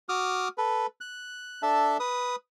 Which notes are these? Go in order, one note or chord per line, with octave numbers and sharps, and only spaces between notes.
F#4 D6 D#6 F6
A4 B4
F#6
D4 A4 E5 A5
B4 D#6